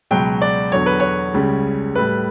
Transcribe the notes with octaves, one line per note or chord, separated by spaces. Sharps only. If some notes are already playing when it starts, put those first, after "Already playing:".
C#2 B2 F#3 G5
D5
E2 D3 F#3 C#5
B4
C#5
C#2 C#3 G3
A2 G3 B4